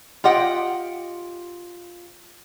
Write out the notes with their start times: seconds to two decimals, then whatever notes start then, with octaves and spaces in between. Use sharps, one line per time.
0.24 F4 G4 D#5 F#5 G5